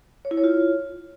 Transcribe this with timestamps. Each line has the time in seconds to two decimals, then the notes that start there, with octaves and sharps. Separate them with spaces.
0.25 C#5
0.31 E4
0.37 C#5
0.44 F4